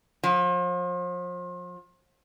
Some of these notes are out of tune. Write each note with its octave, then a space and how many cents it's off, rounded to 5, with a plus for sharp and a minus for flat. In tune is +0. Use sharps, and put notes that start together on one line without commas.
F3 +35